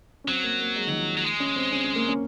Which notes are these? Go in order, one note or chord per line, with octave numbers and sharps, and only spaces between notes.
C#4
F#3 C4
A#3
A#3
G#3
D#3
F3
F#3
G#3
C#4
C4
C#4
C#4
A#3
C#4